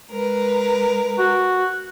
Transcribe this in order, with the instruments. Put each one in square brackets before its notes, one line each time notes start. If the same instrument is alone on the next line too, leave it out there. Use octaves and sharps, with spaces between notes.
[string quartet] G#3 A#4 B4
[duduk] F#4